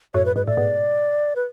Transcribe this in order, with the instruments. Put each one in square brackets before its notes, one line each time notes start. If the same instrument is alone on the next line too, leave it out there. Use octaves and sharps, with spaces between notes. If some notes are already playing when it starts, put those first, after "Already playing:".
[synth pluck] F#2 A2 [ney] C#5
[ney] B4
[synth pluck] G#2 [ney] B4
[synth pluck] A2 [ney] D5
[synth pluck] G#2 B2
[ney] B4